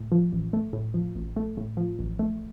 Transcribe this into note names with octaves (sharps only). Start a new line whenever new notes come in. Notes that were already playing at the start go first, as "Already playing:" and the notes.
Already playing: A2
F3
A1
A3
A2
F3
A1
A3
A2
F3
A1
A3